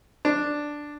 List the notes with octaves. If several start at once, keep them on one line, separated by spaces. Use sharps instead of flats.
D4